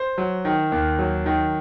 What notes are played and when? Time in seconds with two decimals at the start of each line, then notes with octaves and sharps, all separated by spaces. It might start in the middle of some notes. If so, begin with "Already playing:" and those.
Already playing: C5
0.18 F#3
0.45 D#3
0.72 D#2
0.99 F#3
1.26 D#3